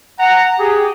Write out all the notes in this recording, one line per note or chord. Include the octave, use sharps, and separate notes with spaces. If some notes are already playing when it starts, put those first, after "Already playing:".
F#5 A#5
G4 G#4